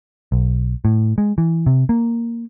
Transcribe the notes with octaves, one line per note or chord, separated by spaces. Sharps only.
B1
A2
G#3
E3
C3
A#3